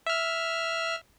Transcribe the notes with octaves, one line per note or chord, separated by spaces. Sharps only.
E5 F6